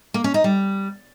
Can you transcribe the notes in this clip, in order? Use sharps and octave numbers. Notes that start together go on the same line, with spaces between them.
A#3
C#4
D#4
G3